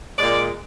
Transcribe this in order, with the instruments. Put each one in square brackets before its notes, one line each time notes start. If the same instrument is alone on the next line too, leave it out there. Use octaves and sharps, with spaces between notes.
[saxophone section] A#2 G#3 D5